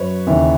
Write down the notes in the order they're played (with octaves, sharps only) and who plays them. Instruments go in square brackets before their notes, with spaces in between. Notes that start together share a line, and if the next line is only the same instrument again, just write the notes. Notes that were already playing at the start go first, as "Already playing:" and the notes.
Already playing: [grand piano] F#2 B4 C#5
D#2 C#3 E3